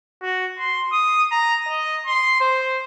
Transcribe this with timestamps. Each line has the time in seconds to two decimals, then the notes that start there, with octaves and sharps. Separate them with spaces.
0.22 F#4
0.59 C6
0.93 D#6
1.31 A#5
1.68 D#5
2.07 C6
2.41 C5